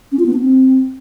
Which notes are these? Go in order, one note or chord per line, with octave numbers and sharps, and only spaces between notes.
C#4
F4
B3
D4
C4